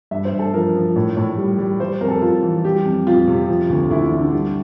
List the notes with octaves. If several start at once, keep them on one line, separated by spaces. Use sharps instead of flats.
G2 E5
C5
G2
A4
F3 A#4
F3
A2
A2
G3
G3
G3 C5
F2 A#4
A4
F2 F4
E3
G3 G4
F2
F2 F4
C3
F3
D2
D2 E4
E4
D3
D4
G3